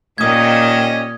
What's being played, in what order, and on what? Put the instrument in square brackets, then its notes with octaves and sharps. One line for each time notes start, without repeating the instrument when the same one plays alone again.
[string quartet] A#2 [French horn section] D#3 [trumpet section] C#4 G4 D#5 [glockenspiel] D#6 G#6